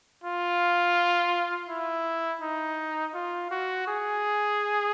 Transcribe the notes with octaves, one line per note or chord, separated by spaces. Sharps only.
F4
E4
D#4
F4
F#4
G#4